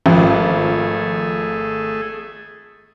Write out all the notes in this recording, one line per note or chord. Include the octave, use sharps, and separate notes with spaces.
G#1 F3 A3 G#4